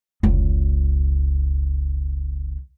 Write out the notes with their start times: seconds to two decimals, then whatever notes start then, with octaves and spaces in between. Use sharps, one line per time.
0.23 F1 C#2